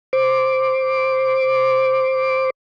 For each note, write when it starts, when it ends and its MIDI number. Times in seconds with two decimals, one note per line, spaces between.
0.13 2.50 72
0.13 2.50 86